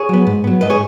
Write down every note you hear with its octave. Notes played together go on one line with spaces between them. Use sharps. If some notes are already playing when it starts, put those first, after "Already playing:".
Already playing: G#4 C#5
F#3 B3
G#2
F#3 B3
G#2 B4 D#5
G#4 C#5